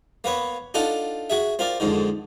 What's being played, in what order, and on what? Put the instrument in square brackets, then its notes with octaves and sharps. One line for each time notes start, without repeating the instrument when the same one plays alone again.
[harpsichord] A#3 B3 B4 C#5
D4 D#4 F4 A4 F#5
F#4 G#4 E5
C4 F4 A#4 D5
F2 G#2 D3 D#3